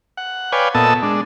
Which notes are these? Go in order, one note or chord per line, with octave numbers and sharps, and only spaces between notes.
F#5
B4 C#5 D5 F5 G5 G#5
A#2 B3 A4 D#5 A5 E6
G#3 D4